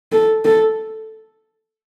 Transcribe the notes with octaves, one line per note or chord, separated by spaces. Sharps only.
A4
A4